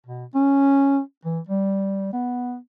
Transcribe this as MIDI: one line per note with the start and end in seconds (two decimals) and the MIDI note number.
0.06 0.25 47
0.35 1.00 61
1.25 1.39 52
1.49 2.10 55
2.13 2.56 59